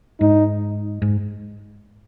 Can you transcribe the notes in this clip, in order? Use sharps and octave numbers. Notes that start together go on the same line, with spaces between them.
G#2 D#4
G#2